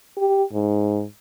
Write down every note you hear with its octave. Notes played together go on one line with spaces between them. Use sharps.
G4
G#2